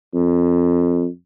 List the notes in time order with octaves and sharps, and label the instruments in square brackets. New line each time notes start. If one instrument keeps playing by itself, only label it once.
[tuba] F2